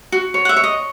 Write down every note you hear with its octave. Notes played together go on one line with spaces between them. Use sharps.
F#4
C#5
F#5
E5
C#5
D#5